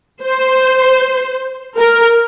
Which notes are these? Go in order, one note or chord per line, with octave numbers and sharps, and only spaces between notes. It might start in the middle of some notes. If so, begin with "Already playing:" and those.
C5
A#4